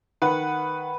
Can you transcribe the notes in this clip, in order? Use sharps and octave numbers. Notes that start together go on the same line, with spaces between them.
D#3 B4 F#5